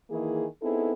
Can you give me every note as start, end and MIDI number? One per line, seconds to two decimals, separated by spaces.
0.10 0.45 51
0.10 0.45 52
0.10 0.45 58
0.10 0.45 64
0.10 0.45 68
0.62 0.92 59
0.62 0.92 60
0.62 0.92 63
0.62 0.92 64
0.62 0.92 68
0.62 0.92 69